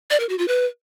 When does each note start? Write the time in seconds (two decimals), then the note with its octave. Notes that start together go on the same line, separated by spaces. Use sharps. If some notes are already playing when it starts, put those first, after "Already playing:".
0.10 D5
0.20 A#4
0.29 F#4
0.39 F4
0.48 B4